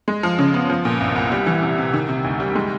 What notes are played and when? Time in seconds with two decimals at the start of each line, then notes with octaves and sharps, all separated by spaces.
0.08 G#3
0.23 F3
0.38 C#3
0.54 B3
0.70 F3
0.85 A#2
1.00 C2
1.16 C2
1.32 G3
1.46 E3
1.62 C3
1.78 C3
1.93 D#3
2.09 C3
2.24 D2
2.40 G3
2.55 G#3